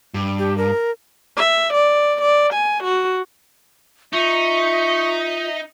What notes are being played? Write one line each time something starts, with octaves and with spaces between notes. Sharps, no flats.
G2
G4
A#4
E5
D5
D5
G#5
F#4
D#4 F4 E5 C#6